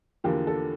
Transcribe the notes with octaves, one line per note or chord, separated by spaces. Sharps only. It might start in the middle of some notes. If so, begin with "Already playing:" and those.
E2 D3 F3 A#3 G4
A4